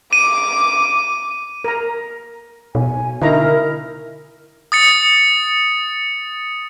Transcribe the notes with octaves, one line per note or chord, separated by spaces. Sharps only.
D6 D#7
A#4 A#5
B2 G#5
D3 D#4 E4 A#4 A#5
D#6 A6 C#7